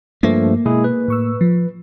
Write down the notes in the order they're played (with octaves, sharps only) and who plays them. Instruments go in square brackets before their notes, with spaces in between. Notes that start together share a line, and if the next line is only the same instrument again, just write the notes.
[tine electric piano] G2 F3 A3 [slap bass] A#3
[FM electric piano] B2 [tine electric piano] G#3 E4 G#4
[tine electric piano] B4
[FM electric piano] A2 C#6 E6
F3